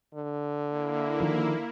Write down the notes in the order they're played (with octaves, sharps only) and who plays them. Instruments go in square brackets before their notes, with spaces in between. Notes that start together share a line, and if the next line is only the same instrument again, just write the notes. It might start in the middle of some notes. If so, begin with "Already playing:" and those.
[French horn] D3
[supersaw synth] A#3 E4
[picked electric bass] D#3 F3